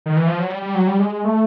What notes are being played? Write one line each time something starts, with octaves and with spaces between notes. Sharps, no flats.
D#3
E3
F3
F#3
G3
G3
F#3
G3
G#3
A3